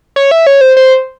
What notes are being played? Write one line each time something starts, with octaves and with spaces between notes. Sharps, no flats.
C#5
E5
C#5
C5
C5